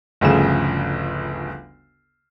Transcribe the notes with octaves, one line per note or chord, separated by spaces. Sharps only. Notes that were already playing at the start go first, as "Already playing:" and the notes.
G1 D2 C#3 F3 E7